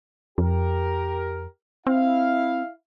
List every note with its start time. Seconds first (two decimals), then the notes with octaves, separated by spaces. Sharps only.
0.38 F2 G4 A#4
1.87 C4 E4 F5